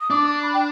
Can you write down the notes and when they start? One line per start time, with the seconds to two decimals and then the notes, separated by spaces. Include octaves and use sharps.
0.01 D#6
0.10 D4 D6
0.27 D6
0.43 B5
0.54 G5